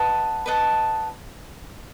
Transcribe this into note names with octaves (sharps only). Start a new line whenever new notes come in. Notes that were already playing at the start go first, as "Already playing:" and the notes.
Already playing: B4 D#5 F#5 A5
B4 D#5 F#5 A5